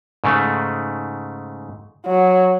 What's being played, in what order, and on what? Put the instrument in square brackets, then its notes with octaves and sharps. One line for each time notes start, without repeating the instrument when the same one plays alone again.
[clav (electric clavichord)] G#2 C#3 A3
[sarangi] F#3